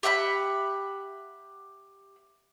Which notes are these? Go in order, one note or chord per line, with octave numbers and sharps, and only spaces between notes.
G4 E5 F#5 B5